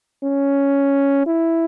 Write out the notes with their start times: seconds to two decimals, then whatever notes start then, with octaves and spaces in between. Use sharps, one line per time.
0.24 C#4
1.26 E4